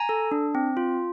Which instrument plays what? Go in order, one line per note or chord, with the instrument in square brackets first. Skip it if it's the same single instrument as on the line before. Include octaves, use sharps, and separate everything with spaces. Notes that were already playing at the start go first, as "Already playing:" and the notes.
Already playing: [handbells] G#5 A#5
A4
D4
C4
F4